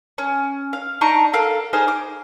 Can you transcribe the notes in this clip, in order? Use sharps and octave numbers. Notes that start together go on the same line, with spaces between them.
C#4
F5
D4 D#4 A#5 C#6
A4 A#4 F5
D#4 G#4 C5 F6
D6